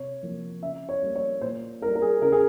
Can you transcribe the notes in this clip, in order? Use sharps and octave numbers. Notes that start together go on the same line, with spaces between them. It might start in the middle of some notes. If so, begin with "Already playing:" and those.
Already playing: C3 C#5
F3 A#3
C#3 E5
C#5
G3 A#3
C#5
A#2 C5
G3 A#3 A#4
A#4
G#4
C#3 A#4
G#4